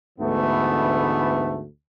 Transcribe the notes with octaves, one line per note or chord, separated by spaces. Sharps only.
D2 G#2 D3 E3 A3 B3